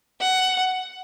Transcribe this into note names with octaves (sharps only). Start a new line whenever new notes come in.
F#5